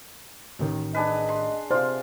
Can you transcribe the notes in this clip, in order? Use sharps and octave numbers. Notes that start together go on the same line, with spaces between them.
A1 D#3
D4 G#4 B4 D#5
C6
C3 F4 C5 D5 F5